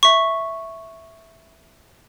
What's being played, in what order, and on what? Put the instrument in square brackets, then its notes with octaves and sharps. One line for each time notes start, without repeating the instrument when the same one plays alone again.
[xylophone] E5 C#6